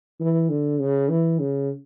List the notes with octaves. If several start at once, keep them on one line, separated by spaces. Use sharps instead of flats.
E3
D3
C#3
E3
C#3